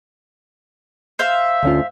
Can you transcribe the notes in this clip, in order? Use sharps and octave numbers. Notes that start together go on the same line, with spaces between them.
C5 E5 F5
D2 C#4 F4